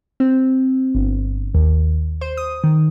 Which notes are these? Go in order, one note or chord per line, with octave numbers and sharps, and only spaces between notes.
C4
G1
D#2
C5
D#6
D#3